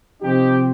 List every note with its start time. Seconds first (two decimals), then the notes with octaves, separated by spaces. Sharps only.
0.22 C3 F3 C4 D#4 G4